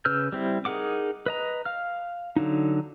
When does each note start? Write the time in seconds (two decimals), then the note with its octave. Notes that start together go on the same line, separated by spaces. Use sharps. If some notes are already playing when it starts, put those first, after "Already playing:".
0.05 C#3 B4 E6 F6 G6
0.32 G3 C4 E4
0.65 D#4 G#4 A#4 F#5 D6
1.26 B4 D#5 A#5
1.65 F5 F6
2.36 D3 F#3 D#4